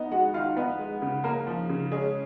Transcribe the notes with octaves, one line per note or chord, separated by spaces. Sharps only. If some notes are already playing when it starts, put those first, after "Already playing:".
Already playing: B3 D#4 D#5
G#3 F#4 F#5
D#3 F4 F5
B3 D#4 B4
G#3
C#3
A#3 A#4
F3
C#3
G#3 C#4 G#4